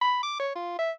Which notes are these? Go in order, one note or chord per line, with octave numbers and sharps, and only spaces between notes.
B5
D6
C#5
F4
E5